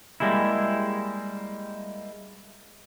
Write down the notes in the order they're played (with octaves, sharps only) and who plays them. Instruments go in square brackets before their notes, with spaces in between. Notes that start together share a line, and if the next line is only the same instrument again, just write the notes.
[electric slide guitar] G3 G#3 A#3 E4